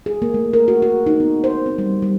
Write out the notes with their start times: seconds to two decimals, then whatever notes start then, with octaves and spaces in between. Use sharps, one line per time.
0.06 G#4
0.22 A#3
0.34 A3
0.53 A#4
0.68 F#4
0.82 F#4
1.06 D#4
1.20 B3
1.44 C5
1.66 C4
1.78 G3
2.02 G3